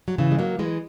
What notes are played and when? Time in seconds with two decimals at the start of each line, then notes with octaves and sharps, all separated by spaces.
0.08 F#3
0.18 C#3 E3
0.32 G#3
0.39 F#3 A#3
0.59 E3 G#3